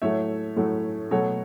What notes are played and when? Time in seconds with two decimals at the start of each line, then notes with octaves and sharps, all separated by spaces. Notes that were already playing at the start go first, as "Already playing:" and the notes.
0.02 A2 F#3 A3 C#5 E5
0.57 A2 F#3 A3
1.11 B2 F#3 A3 A4 C#5